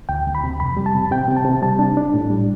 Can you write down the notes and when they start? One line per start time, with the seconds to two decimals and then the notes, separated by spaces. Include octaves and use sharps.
0.09 D2 G5
0.26 D2
0.35 B5
0.44 C3
0.60 F2 B5
0.77 G3
0.86 A5
0.95 C3
1.11 C3 G5
1.28 C3
1.37 A5
1.45 C3
1.62 G3 A5
1.79 D4
1.97 D4
2.14 A2
2.30 G3